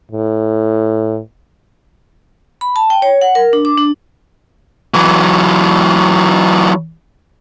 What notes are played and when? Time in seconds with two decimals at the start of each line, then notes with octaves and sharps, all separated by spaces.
0.12 A2
2.61 B5
2.76 A5
2.90 G5
3.02 C#5
3.21 F#5
3.35 A#4
3.53 D4
3.65 D6
3.78 D4
4.94 E3 F#3